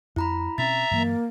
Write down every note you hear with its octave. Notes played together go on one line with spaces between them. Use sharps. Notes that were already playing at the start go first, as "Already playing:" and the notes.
F2 E4 A#5 B5
B2 C4 C#4 E5 A#5 A6
G2 E3 F#3 A#3